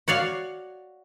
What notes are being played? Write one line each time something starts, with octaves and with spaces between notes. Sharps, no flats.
F#4 C#5 D5 F5